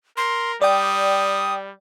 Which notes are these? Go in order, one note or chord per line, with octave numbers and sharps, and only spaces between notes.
A#4 C6
G3 D5 G5 D#6